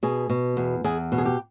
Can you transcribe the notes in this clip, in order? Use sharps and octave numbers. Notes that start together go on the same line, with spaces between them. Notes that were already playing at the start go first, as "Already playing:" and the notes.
B2 G#4
B2
E2
E2 G#4
B2
G#4
G4